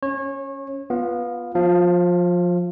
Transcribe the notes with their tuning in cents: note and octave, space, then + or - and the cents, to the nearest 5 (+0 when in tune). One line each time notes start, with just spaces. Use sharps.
C#4 +0 C#5 -30
B3 -10 F4 +0 F5 +15
F3 +20 F5 -20